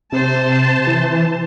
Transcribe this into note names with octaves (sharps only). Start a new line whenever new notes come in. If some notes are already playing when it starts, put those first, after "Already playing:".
C3 C5 A5
E3